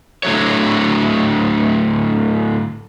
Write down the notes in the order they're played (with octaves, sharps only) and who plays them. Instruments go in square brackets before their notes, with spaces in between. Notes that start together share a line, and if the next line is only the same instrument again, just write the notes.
[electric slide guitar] A2 D3 F#3 A3 C#5